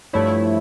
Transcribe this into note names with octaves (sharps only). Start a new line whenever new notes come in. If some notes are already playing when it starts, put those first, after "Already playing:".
G2 F3 A3 E4 C#5